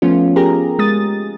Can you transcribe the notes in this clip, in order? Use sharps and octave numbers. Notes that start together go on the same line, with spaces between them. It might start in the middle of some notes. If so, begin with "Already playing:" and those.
F3 A3 B3 C#4 F4
G4 G#4 A#4 A#5
G#3 D#6 A6